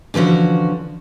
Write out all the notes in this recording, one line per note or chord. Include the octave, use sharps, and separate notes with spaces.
D3 E3 F3 C#4 F#4